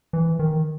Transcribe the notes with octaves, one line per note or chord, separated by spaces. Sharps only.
E3
D#3